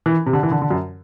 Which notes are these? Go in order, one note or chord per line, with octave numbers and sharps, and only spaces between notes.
E3
C3
D3
E3
D3
D3
F#2